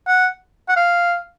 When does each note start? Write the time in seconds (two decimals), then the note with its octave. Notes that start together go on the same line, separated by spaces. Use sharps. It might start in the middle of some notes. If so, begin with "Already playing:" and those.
0.07 F#5
0.69 F#5
0.76 F5